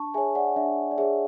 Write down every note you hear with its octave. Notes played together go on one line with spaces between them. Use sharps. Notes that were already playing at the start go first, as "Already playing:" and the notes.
Already playing: D4 A5 C#6
G#4 C#5 E5 G#5
D5 F#5
D4 E5
D5
G#4 C#5 E5